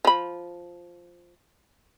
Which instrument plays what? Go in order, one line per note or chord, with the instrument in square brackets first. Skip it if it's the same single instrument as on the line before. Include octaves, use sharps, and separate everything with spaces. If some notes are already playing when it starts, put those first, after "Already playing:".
[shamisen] F3 B5